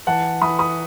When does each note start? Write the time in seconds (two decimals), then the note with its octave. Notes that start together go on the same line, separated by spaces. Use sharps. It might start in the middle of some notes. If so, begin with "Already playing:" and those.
0.07 E3 F#5 A5
0.42 E3 B5 D#6
0.59 B5 D#6